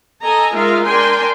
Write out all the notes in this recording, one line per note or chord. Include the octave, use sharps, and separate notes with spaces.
A4 D#5 G#5 A#5
G#3 D#4 F4 A#4 E5 F5
D4 A#4 G5 G#5 C6